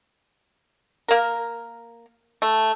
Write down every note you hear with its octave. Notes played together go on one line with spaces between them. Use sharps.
A#3 A#4
A3